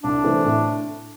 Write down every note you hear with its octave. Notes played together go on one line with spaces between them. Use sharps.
C2 D4
C3 E3 A3 C4
A2